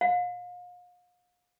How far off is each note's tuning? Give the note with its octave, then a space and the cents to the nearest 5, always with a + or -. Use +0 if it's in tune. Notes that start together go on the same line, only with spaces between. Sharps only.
F5 +35